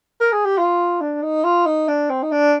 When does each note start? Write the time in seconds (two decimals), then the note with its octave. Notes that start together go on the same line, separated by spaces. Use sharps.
0.20 A#4
0.32 G#4
0.45 G4
0.58 F4
1.01 D4
1.23 D#4
1.45 F4
1.66 D#4
1.88 D4
2.10 C4
2.23 D#4
2.32 D4